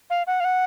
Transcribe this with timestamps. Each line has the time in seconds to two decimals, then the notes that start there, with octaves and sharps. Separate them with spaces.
0.10 F5
0.27 F#5
0.40 F5
0.45 F#5